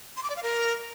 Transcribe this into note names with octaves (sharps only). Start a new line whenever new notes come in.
C6
D6
D5
F5
A#4